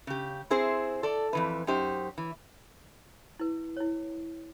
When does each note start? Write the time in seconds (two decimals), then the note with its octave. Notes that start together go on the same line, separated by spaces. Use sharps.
0.07 C#3 G4
0.50 C4 E4 G#4 C5
1.03 A4 D5
1.33 F2 E3 B4
1.67 F#2 D#4 G4 C5
2.18 E3
3.39 E4 B4
3.77 E4 C#5